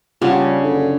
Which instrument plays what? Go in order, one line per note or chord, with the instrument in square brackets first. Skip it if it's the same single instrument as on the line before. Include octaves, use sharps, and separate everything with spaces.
[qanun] C#3 D4 [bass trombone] G3 [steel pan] F4 G4 F#5
[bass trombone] F#1 [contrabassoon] D3